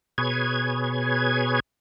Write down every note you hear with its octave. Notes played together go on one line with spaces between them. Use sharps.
B2 G#4 B4 C#5 G#6